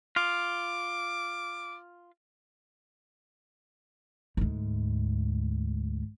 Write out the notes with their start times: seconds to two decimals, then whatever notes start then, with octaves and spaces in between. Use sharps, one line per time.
0.16 F4 D6
4.37 D2 G#2